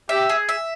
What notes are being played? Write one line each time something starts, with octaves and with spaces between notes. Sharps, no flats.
G4 E5
G#4
E5